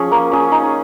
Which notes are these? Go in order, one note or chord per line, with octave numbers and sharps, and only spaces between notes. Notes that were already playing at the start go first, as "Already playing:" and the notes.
Already playing: F3 C#4 G#4
A#3
C#4 G#4
D#4